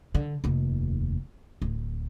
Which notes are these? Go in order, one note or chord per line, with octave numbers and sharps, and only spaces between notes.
D3
F1 D#2
D1